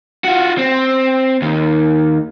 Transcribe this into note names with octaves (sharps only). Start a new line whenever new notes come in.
F4 F#4
C4
D#2